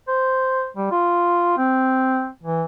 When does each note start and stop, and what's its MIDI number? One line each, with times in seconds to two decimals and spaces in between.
0.08 0.67 72
0.77 0.88 55
0.91 1.55 65
1.58 2.27 60
2.44 2.64 52